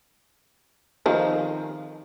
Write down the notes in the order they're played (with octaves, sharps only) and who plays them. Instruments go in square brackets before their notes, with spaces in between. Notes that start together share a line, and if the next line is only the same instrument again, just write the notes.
[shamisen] D#3 F3 C4